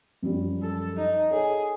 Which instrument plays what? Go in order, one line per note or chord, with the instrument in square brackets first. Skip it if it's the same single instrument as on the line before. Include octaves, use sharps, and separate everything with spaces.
[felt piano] F#2 F3 G3
[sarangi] A4
D#4
[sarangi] G#4 [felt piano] A4 C#5